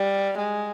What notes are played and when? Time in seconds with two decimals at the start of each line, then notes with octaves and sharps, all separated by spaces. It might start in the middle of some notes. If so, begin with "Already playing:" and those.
Already playing: G3
0.38 G#3